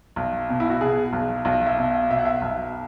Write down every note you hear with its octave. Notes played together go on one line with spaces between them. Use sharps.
B1
B2
E4
F#4
B2 G#4
B1
B1 F#4
E5
B2
B2 E5
F#5
E5
B1